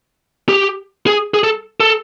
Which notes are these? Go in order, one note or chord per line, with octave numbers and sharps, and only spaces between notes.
G4
G#4
G#4
A4
A4